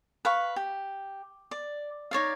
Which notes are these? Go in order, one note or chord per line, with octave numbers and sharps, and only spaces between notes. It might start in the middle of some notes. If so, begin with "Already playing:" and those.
B4 F5 C#6
G4
D5
D#4 C#5 D5 F5